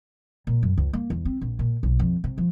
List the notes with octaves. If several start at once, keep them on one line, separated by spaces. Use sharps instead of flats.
A#2
F#2
C#2
A#3
E2
C4
A#1
A#2
B1
F2
C3
F3